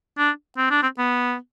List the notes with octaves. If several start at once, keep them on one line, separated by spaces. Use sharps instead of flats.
D4
C4
D4
C4
B3